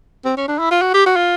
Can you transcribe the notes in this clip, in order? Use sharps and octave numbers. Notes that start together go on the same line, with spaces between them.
C4
C#4
D4
E4
F4
F#4
G4
F#4
F4